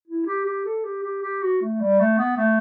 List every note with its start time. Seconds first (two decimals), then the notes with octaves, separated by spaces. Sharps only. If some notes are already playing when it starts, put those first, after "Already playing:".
0.08 E4
0.26 G4
0.45 G4
0.65 A4
0.84 G4
1.03 G4
1.22 G4
1.42 F#4
1.61 A3
1.81 G3
2.00 A3
2.18 B3
2.37 A3